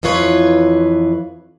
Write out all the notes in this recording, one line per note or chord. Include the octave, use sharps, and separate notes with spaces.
F2 E3 F4 B4 C#5